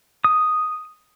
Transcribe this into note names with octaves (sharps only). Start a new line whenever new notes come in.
D#6